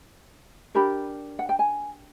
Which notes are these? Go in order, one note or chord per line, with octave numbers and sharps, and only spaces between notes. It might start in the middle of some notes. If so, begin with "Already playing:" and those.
D4 G4 A#4 B5
F#5
G5
G#5